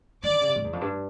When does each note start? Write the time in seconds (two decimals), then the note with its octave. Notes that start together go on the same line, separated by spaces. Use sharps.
0.23 D#3 D5 D6
0.32 D3
0.41 C#3
0.49 C3
0.56 G#2
0.64 E2
0.73 F2
0.81 G2